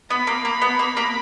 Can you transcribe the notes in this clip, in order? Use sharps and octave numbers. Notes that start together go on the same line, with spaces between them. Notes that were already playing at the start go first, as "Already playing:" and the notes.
B3 B5
A#3
A#3
B3
A#3
A#3